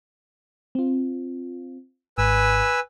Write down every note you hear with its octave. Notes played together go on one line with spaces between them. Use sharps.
C4 F4
G#1 G#2 B4 G#5 E6